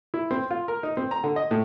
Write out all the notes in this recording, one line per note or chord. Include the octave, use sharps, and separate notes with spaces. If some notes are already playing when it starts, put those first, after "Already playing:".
E4
C4
F4
A#4
D#4
C4
A#5
D3
D#5
A2